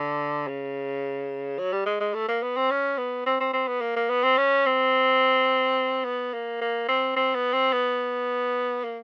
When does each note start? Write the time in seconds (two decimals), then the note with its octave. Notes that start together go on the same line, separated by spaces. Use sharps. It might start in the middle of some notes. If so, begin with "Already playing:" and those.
Already playing: D3
0.47 C#3
1.58 F#3
1.73 G3
1.86 G#3
2.00 G#3
2.14 A3
2.28 A#3
2.43 B3
2.57 C4
2.71 C#4
2.98 B3
3.26 C4
3.40 C4
3.53 C4
3.67 B3
3.81 A#3
3.96 A#3
4.09 B3
4.23 C4
4.37 C#4
4.66 C4
6.04 B3
6.33 A#3
6.61 A#3
6.88 C4
7.16 C4
7.35 B3
7.53 C4
7.73 B3
8.84 A#3